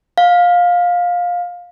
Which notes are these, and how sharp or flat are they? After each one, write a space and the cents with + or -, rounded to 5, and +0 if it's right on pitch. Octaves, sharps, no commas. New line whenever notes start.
F5 +15